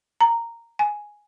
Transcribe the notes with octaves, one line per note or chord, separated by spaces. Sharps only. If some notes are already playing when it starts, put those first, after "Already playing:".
A#5
G#5